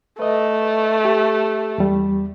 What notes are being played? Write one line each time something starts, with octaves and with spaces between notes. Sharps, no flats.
A3 B4 D#5
G4
E2 G3